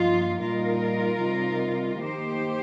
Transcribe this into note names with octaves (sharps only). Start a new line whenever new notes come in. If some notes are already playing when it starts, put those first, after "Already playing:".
Already playing: G2 F3 A#3 D#4 F4
A#2 G3 D#4 F4 A#4
C3 G3 D#4
D#3 A#3 D#4 G4 C5